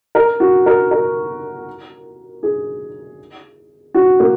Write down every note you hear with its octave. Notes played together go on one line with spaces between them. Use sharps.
A#4
F#4
A#4
A#4
G#4
F#4
A#3